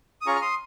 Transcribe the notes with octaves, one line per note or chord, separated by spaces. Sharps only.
D#6
C#4 F4 G#4 A#5 C#6
F6
C6 D#6